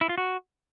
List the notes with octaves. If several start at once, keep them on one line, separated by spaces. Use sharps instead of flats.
E4
F4
F#4